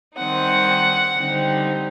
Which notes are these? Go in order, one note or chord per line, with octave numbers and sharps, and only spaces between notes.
D#3 G3 C4 D#4 F#5
D3 G3 C4 D#4